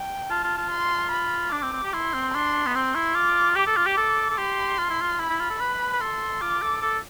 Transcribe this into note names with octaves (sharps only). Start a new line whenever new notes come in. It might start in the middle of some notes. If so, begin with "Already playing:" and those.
Already playing: G5
F4 A5
F4
F4
C6
B5
D4 D6
C4
C4
G4
E4 C6
C4
D4 C6
B3
C4 C6
E4
F4 D6
G4 D6
A4
F4
G4
A4
A4
G4 C6
F4
E4
F4
E4 B5
E4
F4
A4
B4 B5
B4
A4 C6
F4 D6
A4
A4